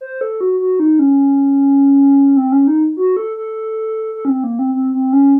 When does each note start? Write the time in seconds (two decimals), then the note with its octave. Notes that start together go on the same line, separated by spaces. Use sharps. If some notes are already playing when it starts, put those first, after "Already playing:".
0.01 C5
0.21 A4
0.41 F#4
0.60 F#4
0.80 D#4
0.99 C#4
2.37 C4
2.52 C#4
2.67 D#4
2.97 F#4
3.17 A4
3.37 A4
4.15 A4
4.25 C#4
4.29 C4
4.44 A#3
4.59 C4
4.74 C4
4.94 C4
5.13 C#4